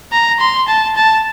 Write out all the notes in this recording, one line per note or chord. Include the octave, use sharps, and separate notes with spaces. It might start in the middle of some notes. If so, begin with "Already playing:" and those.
A#5
C6
A5
A5